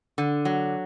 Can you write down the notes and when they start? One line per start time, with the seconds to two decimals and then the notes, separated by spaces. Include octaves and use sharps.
0.18 D3
0.45 F#3